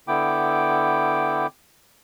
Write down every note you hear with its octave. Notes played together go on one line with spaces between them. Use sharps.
D3 B3 E4 G5 D6